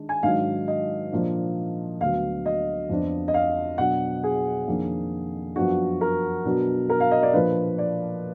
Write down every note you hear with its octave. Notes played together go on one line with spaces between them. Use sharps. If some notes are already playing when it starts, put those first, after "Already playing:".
Already playing: D#3 G#3 D4
G#5
G#2 D#3 F#3 D4 F5
D#5
A#2 F3 A#3 D4
D2 D3 F#3 B3 F5
D#5
F2 F3 B3 D4
D#5
F5
B2 F#3 D4 F#5
G#4
F2 D#3 A#3 D4
F#2 F3 B3 D4 F#4
A#4
B2 F#3 B3 D4
A#4
F5
D#5
D5
A#2 F3 A#3 D4 B4
D5